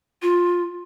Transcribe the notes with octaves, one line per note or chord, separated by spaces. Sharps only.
F4